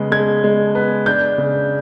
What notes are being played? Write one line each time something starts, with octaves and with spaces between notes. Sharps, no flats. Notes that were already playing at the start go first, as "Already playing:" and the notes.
Already playing: C#3 G#3 B3
G#3 G#6
G#3
B3
D4 G6
C#3